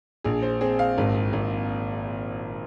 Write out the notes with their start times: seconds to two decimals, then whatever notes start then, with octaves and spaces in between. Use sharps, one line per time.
0.24 A#1 G#4
0.42 C5
0.61 C4 G#4
0.79 F5
0.98 G#1
1.33 G#1